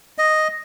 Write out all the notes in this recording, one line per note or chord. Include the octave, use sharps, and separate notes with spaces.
D#5